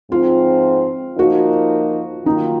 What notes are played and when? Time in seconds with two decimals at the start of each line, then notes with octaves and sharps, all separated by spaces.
0.11 G#2 F3 C4 F4
1.18 F3 A#3 D#4 F#4 A#4
2.25 D#3 F#3 A#3 D#4 F4